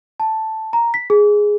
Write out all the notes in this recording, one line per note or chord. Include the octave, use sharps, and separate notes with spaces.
A5
A#5
B6
G#4